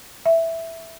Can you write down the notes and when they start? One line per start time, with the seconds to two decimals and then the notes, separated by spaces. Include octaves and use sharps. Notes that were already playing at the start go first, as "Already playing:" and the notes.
0.26 E5